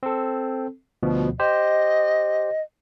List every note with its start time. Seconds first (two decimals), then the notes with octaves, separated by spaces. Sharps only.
0.03 C4 A4
1.03 D2 B2 F3
1.40 G4 C5 D#5